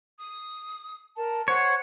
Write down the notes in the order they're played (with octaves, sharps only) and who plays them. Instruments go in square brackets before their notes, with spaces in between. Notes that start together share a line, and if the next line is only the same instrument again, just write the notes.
[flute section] D#6
A#4 A5
[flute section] C5 F#5 F#6 [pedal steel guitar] C#5